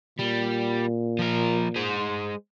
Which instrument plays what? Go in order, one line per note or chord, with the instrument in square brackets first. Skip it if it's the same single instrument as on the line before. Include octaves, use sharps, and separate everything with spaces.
[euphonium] A#2 [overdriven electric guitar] G3
[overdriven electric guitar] F3 A#4
G#3 C5